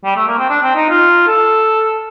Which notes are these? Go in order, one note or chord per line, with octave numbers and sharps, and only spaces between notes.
G3
A3
A#3
C4
D4
C4
D#4
F4
A4